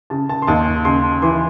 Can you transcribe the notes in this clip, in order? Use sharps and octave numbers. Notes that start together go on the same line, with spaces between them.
C#3 A5
A5
C6
D#2 A5
C#3 C6
E3 C6